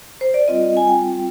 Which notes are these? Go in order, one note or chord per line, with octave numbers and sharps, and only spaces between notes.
C5
D5
G3 C4 F4 D#5
G#5
G5